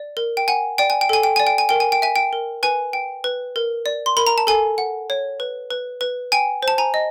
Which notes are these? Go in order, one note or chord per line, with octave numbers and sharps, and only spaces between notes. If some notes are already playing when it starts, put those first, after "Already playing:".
Already playing: D5
A#4
G5
F#5 G#5
D5 G5
G#5
G5
A4 G#5
G5
D5 G#5
G5
G#5
A#4 G5
G#5
G5
E5 G#5
G5
A#4
B4 G#5
G5
B4
A#4
D5
C6
A#4 B5
A#5
A5
A4 G#5
F#5
C#5
B4
B4
B4
G5 G#5
C5
A5
G#5 A#5
D#5